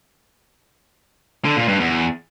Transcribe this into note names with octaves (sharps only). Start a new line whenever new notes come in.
D3
A#2
G2
E2